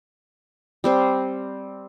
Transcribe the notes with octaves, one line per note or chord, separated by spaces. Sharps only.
G3 C4 C5